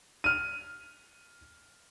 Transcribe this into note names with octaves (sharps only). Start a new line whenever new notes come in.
F6 D#7